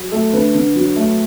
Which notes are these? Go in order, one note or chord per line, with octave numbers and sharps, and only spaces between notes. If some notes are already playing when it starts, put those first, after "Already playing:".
Already playing: F#3
A3 A4
D3 B4
D3
F#3
A3